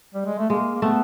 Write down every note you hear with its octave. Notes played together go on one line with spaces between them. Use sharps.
G3
G#3
A3
G#3 A#3
A#3
A3 B3